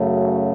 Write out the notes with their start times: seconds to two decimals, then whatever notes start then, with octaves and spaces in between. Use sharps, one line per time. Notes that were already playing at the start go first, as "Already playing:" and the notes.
Already playing: F#2 C#3 F#3 A3